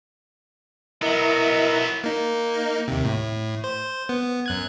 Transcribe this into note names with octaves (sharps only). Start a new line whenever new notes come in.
F#3 B3 E4 A#4 D#5
A#3 D#4
D#2 C3
A2
C5
B3
F#2 F#6 G#6